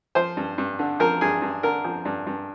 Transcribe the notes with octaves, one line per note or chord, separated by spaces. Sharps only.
F3 C5
G2
G2
D3
F3 A#4
G2 G#4
G2
D3 A#4
F3
G2
G2